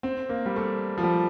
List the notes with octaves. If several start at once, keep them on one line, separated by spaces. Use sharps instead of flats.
C4
A#3
G3
A3
F3
G3